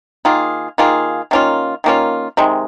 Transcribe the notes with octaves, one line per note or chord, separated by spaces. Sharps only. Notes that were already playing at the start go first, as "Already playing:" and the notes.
D#3 A#3 F4 G#4
D#3 A#3 F4 G#4
D#3 A#3 C#4 F4
D#3 A#3 C#4 F4
C3 D#3 G#3